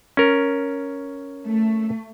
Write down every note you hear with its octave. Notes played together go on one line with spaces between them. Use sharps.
C#4 A#4
A3